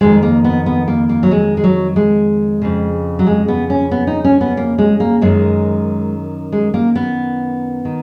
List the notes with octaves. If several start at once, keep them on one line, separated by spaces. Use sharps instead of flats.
F2 D#3 G#3
A#3
B3
B3
A#3
A#3
F#3
G#3
G#3
F#3
G#3
F2 C#3
F#3
G#3
B3
C#4
B3
D#4
C#4
B3
A#3
G#3
A#3
F#2 D#3 G#3
G#3
A#3
B3
D#3